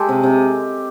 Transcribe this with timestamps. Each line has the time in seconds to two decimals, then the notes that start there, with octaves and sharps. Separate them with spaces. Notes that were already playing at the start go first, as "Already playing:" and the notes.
Already playing: G#3 G4 A4
0.09 C3
0.23 C3